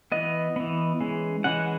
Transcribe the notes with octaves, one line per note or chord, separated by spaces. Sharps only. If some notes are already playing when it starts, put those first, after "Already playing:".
E3 B3 D#5
E3 B3
E3 G#3 C#4
E3 G#3 C#4 F#5